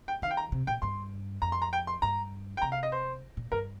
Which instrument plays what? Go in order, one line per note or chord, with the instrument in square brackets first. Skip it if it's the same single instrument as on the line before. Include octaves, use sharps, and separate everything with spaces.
[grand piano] G5
[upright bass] D#3 [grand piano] F5
[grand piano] G5
A#5
[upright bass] C3
[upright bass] A#2 [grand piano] G5
[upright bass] G2 [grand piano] C6
[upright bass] F2 [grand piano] A#5
[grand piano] C6
A#5
G5
C6
[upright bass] G2 [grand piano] A#5
[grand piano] G5
[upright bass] C3 [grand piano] A#5
[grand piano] F5
D#5
C5
[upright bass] A#2
[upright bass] G2 [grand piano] A#4